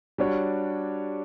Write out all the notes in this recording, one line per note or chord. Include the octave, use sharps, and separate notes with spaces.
G3 D4 F#4 C#5